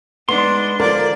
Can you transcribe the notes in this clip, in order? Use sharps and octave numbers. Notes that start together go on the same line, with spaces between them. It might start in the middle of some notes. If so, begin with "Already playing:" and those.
G#3 B3 D4 D#4 C6
D3 F3 A#4 D5